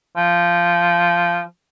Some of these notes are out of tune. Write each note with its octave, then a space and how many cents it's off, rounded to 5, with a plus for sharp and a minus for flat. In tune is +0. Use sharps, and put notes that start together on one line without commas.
F3 -15